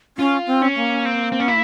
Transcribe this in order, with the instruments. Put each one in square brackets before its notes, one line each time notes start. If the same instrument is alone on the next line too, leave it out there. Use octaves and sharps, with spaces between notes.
[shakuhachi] C#4 [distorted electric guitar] F4
[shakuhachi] C4
[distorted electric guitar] C#4
[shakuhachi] A#3
[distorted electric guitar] C4
C4
C#4
E4